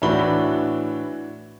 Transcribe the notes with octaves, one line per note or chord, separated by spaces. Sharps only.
A2 E3 D4 F#4 B5 G7